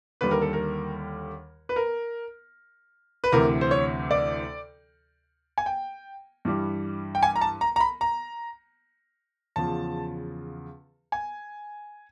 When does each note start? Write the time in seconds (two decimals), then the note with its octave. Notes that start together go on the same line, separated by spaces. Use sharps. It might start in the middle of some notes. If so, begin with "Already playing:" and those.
0.21 D#2 D3 G3 B4
0.31 A#4
0.42 A4
0.53 A#4
1.69 B4
1.76 A#4
3.24 B4
3.32 D2 C3 E3 A#4
3.61 C5
3.71 C#5
4.11 D5
5.58 G#5
5.66 G5
6.45 G2 E3 G3
7.15 G5
7.23 G#5
7.36 A#5
7.41 A5
7.61 A#5
7.76 A#5
7.80 B5
8.01 A#5
9.56 E2 C#3 F3 A5
11.12 G#5